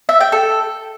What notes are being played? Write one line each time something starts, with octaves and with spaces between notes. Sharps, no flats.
E5
G5
A4